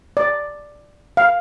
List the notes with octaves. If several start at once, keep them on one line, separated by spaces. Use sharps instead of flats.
D5
F5